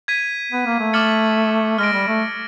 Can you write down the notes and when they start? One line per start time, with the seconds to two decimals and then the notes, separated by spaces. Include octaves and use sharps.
0.08 G#6 B6 D#7
0.52 B3
0.66 A#3
0.79 A3
0.93 D6 F6 A6 C#7 F#7
1.78 G#3 F6 A#6 D7
1.94 G3
2.08 A3